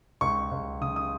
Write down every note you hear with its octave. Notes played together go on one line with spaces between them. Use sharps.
C#2 C#6
C#2
C#3 D#6
D#6